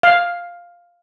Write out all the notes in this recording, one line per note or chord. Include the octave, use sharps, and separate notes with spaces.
F5